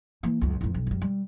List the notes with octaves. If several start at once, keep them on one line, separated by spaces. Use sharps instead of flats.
E3 A#3
C#2 F#2
A1 F2
B1
F#2 G3
G3